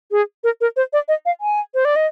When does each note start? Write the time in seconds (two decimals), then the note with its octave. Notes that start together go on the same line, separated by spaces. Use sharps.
0.11 G#4
0.44 A#4
0.61 A#4
0.76 C5
0.93 D5
1.08 D#5
1.26 F5
1.41 G#5
1.74 C5
1.85 D5
1.96 D#5